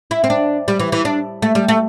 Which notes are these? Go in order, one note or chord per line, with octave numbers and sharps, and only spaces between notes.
E4
C4
D4
G3
E3
E3
D4
A3
G3
A3